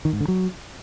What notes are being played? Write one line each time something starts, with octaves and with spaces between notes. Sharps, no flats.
D#3
G#2
D3
F#3